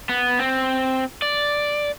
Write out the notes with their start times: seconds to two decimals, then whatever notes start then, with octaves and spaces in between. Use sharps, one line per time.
0.09 B3
0.39 C4
1.22 D5